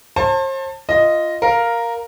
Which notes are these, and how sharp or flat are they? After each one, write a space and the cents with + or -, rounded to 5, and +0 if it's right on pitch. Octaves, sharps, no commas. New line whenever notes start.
C5 +40 A5 +25
F4 -15 D#5 +0
A#4 +0 F5 +0